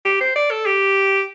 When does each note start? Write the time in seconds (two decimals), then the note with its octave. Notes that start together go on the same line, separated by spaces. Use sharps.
0.05 G4
0.21 C5
0.36 D5
0.51 A4
0.66 G4